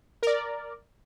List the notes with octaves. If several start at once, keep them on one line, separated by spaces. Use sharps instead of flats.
A#4 D5